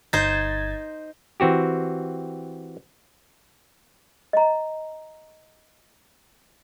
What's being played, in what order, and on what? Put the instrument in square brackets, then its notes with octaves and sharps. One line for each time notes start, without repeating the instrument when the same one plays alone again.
[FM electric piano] G1 G#6 A6 [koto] D#4 C5
[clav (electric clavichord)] E3 C4 F#4 G4
[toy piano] D#5 A#5